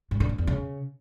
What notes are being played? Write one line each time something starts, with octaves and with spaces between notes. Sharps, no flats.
G#2
D3
A2
E2
C#3